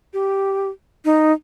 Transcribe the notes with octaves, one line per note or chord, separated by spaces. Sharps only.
G4
D#4